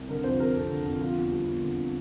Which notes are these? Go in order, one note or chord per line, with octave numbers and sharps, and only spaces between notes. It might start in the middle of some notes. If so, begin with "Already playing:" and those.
Already playing: C2
D3 A#4
F2 C5
G3 A#4
F2 A4
D3
F2
D3 F4
E2
G3
E2
D3